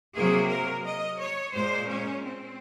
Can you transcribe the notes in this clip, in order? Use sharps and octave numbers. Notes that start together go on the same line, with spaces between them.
C3 F#3 A#3 G#4
A#4
D#5
C#5
A#2 G#3 C5
C#4
C4